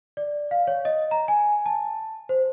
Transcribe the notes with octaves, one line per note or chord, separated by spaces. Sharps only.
D5
F5
C#5
D#5
A#5
G#5
A5
C5